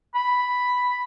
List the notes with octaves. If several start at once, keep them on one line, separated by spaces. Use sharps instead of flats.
B5